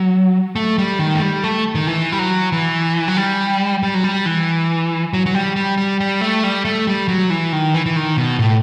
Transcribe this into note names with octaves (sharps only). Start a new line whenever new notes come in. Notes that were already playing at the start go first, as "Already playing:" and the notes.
Already playing: F#3
A3
G3
D#3
A3
G3
A3
D#3
E3
G3
F#3
E3
F#3
G3
G3
F#3
G3
E3
F#3
F#3
G3
G3
G3
G3
A3
G3
A3
G3
F#3
E3
D#3
E3
E3
D#3
B2
A2